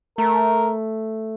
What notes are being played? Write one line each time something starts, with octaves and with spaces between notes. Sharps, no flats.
A3 A#4